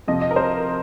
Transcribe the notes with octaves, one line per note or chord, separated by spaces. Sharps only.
F2 C3 F3 D#5
D#5
A#4
C5